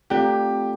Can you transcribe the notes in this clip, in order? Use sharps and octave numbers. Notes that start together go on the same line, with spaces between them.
A3 C4 F4 G4 A4 D5